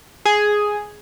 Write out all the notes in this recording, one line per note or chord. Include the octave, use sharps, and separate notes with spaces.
G#4